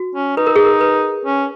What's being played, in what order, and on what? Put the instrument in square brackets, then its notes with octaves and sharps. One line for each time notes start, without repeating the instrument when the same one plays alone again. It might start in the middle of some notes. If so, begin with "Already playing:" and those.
Already playing: [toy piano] F#4
[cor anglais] C#4
[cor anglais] D#4 [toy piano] B4
[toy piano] A#4
G#4
A#4
B4
[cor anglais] C#4